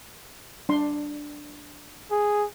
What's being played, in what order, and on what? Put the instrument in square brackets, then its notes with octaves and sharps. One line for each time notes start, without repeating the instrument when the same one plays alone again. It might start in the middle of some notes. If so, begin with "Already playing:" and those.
[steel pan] D4 C6
[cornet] G#4